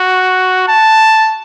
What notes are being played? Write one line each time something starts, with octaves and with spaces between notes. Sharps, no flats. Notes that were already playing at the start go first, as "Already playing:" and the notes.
Already playing: F#4
A5